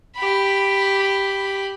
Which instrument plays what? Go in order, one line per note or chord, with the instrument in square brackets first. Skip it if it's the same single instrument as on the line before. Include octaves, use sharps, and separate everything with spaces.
[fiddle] G4 B5